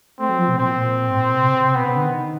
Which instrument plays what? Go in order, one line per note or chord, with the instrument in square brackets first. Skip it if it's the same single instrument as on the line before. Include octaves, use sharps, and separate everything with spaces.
[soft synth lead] A3 [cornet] C4
[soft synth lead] F#3
F3
B2
[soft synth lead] A#2 [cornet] C4
[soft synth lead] A#2
G#2
A2
A#2
B2
C3
C#3
C3
[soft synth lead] B2 [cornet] B3
[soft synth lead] C#3
D3
D#3